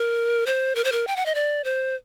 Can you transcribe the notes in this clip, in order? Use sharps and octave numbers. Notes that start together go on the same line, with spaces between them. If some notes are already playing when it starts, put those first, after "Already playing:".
Already playing: A#4
C5
A#4
C5
A#4
G5
F#5
D#5
D5
C5